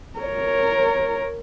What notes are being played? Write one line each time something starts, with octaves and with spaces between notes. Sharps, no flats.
A#4 C#5